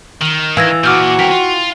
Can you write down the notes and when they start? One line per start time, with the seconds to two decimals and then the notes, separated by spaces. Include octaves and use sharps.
0.22 D#3 F#7 G7
0.57 E3 F5 G#6 A#6
0.84 A#2 F#4 D6 F6 G6
1.19 C4 A#4 G5 B6
1.31 F4